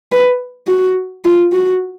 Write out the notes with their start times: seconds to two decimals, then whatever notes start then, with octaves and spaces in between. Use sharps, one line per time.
0.12 B4
0.68 F#4
1.25 F4
1.53 F#4